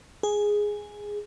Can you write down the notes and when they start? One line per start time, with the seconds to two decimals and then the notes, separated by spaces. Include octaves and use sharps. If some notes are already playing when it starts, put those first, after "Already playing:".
0.23 G#4